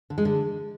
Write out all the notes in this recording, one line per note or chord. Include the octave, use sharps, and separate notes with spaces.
D3
G#3
D3